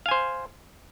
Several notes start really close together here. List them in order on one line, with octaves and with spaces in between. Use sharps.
F5 G#5 C5